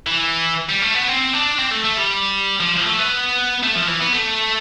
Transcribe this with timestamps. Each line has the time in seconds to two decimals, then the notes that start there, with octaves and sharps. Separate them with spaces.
0.06 E3
0.70 G3
0.82 A3
0.95 B3
1.08 C4
1.34 D4
1.59 C4
1.71 A3
1.84 A3
1.97 G3
2.60 F3
2.86 A3
2.99 B3
3.63 A3
3.76 F3
3.88 E3
4.01 B3
4.13 A3